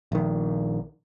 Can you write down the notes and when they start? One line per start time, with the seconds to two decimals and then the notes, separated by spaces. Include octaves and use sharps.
0.12 A#1 D#3